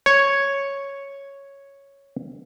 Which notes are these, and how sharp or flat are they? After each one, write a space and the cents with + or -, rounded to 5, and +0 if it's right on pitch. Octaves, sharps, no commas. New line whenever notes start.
C#5 +0